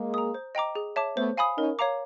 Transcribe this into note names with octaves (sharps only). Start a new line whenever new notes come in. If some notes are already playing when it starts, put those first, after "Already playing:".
Already playing: G#3 A#3
A#5 D#6
C5
D#5 G5 A#5 D6
G#4
C#5 E5 A5 D6
A3 B3 C5
F5 G#5 B5 D#6
C#4 D#4 A#4
C#5 F5 A#5 D6